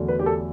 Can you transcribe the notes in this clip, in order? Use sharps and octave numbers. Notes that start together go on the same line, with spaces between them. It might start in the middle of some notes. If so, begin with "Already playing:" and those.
Already playing: E2 D3 F#3 A3
B4
G4
A4